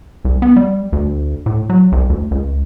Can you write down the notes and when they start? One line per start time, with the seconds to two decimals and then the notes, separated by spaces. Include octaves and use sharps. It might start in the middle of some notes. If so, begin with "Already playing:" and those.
0.25 C2
0.42 B3
0.56 G3
0.92 D2
1.46 A2
1.70 F#3
1.92 C2
2.10 D2
2.31 C#2